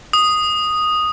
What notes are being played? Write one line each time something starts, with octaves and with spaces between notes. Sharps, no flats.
D#6